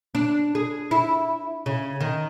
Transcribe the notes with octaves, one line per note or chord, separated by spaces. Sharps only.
D4
G#4
E4
C#3
D#3